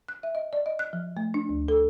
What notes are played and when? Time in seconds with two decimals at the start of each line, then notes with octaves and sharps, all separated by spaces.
0.09 F#6
0.23 E5
0.35 D#5
0.53 D5
0.66 D#5
0.79 F#6
0.93 F3
1.17 A3
1.34 D4
1.49 D2
1.68 A4